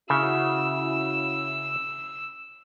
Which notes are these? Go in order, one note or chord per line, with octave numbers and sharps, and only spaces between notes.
C#3 C#4 E4 F#4 E6